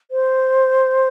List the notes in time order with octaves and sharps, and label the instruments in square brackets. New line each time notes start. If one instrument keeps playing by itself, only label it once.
[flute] C5